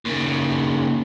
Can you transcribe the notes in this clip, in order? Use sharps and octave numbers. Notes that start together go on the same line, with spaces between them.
D#2 C#3